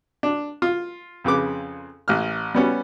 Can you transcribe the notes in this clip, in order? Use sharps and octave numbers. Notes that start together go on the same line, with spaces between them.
D4
F4
F2 C#3 B4 D6
A1 F6
G3 B3 C#4